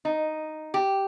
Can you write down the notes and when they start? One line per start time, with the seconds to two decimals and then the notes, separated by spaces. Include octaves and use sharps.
0.05 D#4
0.74 G4